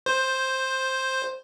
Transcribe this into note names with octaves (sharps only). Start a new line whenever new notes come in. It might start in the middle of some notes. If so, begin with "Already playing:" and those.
C5